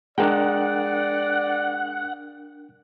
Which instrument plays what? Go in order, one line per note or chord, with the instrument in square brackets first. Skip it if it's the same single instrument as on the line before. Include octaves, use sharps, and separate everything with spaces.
[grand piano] G#3 [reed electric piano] D4 A#4 G5 [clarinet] D5 [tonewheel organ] F#5